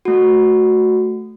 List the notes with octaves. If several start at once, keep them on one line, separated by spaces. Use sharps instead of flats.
A3 F#4